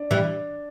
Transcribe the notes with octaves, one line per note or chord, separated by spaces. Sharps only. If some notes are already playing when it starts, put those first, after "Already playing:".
Already playing: D4
E3 G3